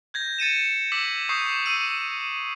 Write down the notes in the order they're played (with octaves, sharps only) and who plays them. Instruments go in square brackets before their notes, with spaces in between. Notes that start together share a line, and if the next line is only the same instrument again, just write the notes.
[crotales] G6 G#6 A#6
A6 C#7 D#7 E7
D6 E6 B6 F#7
C#6 D#6 G6 C7
E6 D#7